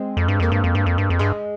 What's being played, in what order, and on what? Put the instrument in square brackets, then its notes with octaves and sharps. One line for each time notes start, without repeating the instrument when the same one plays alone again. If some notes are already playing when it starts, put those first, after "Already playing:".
Already playing: [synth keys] G#3 C4
[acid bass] F2
G2
[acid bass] F2 [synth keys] A#3
[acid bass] G2
F2
G2
F2
G2
F2
[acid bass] G2 [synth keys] G#3